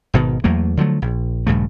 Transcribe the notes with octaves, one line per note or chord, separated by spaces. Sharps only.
G#1 B2 D#3
E2 F#3 A3 A#3
D3 F3 F#3 A3
A#1
A#1 G2 C#3 A3